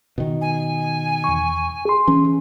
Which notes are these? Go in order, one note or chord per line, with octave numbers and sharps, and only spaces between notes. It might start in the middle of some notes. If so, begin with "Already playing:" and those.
B2 D#3
G#5
E2 C#6
G#4 C6
E3 C#4